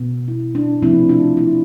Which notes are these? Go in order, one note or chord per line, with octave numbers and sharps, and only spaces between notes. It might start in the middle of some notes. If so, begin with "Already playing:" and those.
Already playing: B2 B3
E4
D4
C3 F3 A3 C4 E4
D4 F4
E4